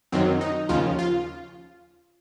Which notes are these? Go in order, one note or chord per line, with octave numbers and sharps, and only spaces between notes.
F#2 D#3 F#3 C4
D#4
D#2 C#3 F3 F4
F4